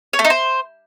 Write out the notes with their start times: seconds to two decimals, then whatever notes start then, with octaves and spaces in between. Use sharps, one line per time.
0.13 C#5
0.19 A3
0.25 D#4
0.30 C5